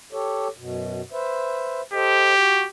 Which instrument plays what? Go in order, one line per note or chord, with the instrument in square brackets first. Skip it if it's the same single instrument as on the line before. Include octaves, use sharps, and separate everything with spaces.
[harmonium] G4 A4 C#5
F#2 B2
B4 C5 E5
[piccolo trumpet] G4 [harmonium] A4 C5 D#5
[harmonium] F#4